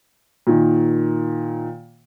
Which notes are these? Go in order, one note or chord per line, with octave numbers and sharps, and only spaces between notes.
A#2 D#3